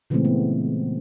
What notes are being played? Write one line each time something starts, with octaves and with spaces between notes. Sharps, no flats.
A#2 C#3 E3 G#3 A3 C4
B3